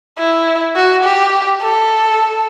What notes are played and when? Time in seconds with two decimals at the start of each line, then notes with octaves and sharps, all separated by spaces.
0.18 E4
0.76 F#4
1.04 G4
1.62 A4